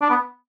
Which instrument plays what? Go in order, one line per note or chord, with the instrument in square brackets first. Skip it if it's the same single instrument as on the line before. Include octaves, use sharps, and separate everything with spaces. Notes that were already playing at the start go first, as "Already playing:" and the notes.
[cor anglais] D4
B3